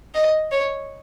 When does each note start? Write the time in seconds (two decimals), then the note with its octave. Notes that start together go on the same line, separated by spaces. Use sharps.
0.15 D#5
0.51 C#5